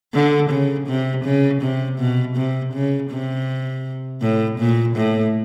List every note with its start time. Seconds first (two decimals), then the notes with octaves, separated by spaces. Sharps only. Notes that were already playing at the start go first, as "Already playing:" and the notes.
0.14 D3
0.50 C#3
0.87 C3
1.25 C#3
1.62 C3
1.98 B2
2.36 C3
2.73 C#3
3.11 C3
4.22 A2
4.59 A#2
4.96 A2